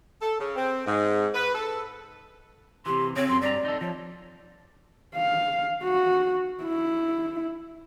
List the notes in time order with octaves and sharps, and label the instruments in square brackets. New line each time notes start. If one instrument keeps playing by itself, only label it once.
[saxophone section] A4
C#3
C4
G#2
B4
A4
[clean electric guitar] C3 E3 [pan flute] G4 [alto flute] C6
[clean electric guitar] C#3 [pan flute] C4 [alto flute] C#5
[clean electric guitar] F#2 [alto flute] C6
[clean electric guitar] G2 A#5 [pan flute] C4 [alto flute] D5
[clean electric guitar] D#4 A4
[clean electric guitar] F3 [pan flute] C#5
[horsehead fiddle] F5
F#4
E4